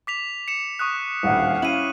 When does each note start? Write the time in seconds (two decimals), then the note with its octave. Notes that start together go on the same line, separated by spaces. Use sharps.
0.07 D6 B6 F7
0.48 C#7 E7
0.79 C#6 D#6 F#6
1.23 D#1 A1 D2 F5 F#5
1.62 C#4 E4 F5 D#7 F#7